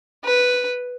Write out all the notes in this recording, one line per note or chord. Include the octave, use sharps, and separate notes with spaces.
B4